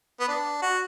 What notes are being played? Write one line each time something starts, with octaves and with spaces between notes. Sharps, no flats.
B3
D4
F#4